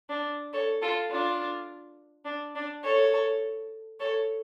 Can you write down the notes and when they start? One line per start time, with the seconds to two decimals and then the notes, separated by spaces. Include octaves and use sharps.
0.09 D4
0.52 A4 C#5
0.81 F4 A4
1.10 D4 F4
2.25 D4
2.55 D4
2.83 A4 C#5
3.99 A4 C#5